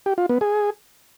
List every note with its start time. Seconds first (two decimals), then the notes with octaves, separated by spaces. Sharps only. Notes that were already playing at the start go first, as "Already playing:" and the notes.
0.06 G4
0.18 F4
0.29 B3
0.41 G#4